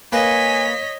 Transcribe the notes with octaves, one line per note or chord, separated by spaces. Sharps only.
A#3 B4 C#5 D#5 G#5 B6